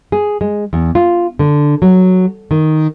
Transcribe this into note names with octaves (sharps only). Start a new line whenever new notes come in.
G#4
G#3
E2
F4
D3
F#3
D#3